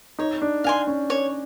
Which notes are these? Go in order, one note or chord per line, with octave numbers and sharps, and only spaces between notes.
D#4 C#5
D4
D4 F5 G#5 C6
C#4
C#5